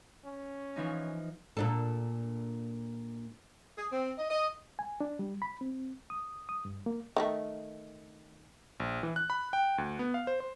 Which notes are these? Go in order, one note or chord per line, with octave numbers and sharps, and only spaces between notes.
C#4
E3 F3 D#4
A#2 D4 A4
G#4
C4
D#5
D#5
G#5
D4
G3
B5
C4
D#6
D#6
G2
A#3
D#3 F#3 A3
A#1
E3
F#6
B5
G5
D2
B3
F5
C5
C5